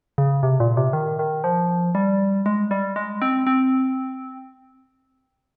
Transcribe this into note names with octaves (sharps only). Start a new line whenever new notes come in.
C#3
C3
A#2
C3
D#3
D#3
F3
G3
G#3
G3
G#3
C4
C4